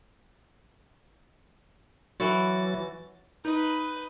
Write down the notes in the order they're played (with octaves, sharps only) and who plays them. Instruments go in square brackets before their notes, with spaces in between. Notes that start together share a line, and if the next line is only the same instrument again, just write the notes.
[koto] E3 F#4 [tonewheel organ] F#3 A6
[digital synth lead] D#4 [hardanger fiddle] B4 D#5